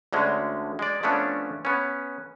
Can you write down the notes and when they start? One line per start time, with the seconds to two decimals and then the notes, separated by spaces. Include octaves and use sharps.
0.13 D2 D3 G#3 C#4
0.79 G#3 D5
1.03 F3 A3 B3 C#4 D4
1.65 B3 C#4